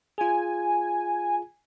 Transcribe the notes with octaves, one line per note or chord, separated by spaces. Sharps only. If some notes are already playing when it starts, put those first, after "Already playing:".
F4 G#4 G#5